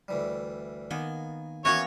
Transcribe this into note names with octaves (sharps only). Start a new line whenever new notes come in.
D2 E3 G3
D#3 A#3 B3 G#5
E3 A#3 B3 C#4 F#4 C#5